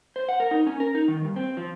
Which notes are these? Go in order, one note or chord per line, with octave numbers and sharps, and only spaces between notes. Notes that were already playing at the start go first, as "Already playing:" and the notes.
C5
F#5
A#4
D#4
C#4
A#4
D#4
D#3
G2
C4
F3